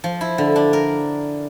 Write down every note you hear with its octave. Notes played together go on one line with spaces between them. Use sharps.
F3
E4
D3
D4
A#4